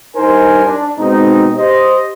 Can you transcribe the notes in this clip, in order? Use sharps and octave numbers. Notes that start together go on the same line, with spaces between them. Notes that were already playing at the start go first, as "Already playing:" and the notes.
G2 D#4 A#4 C5 G#5
D4
B2 G#3 C4 D#4
G4 C5 D#5